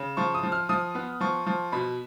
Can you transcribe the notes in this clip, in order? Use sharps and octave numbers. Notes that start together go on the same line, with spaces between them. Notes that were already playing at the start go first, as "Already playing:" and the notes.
Already playing: C#3
F3 C#6
D#6
F3
F6
F3 D#6
B3
F3 C#6
F3
B2 B5